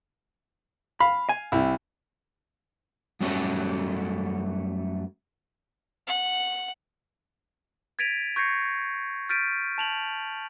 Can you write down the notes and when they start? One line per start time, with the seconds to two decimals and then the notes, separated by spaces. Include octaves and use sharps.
1.00 F5 B5
1.29 G#5
1.52 C2 E4
3.20 F#2 G3 A3 C#4 F#4 A4
6.07 F#5
7.99 G#6 A6 B6 D7 D#7 F7
8.36 C#6 G6 G#6 A#6 C7 C#7
9.29 F6 G6 A6 B6 D7 D#7
9.78 A5 F7 F#7